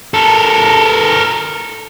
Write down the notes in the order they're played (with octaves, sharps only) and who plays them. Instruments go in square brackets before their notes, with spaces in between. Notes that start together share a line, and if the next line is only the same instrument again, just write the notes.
[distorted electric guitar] A4 A#4